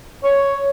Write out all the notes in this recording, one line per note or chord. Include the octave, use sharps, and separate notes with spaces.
C#5